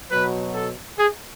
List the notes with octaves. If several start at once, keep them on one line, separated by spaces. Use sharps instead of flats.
B2 F#3 B4
A4
G#4